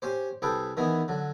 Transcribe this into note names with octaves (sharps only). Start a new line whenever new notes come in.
C#4 G4 C5
C2 G#4 A4 B4 G5
D#3 E3 B3 G#4
D3 F#3